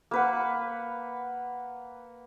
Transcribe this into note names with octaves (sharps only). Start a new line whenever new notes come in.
A#3 B4 F#5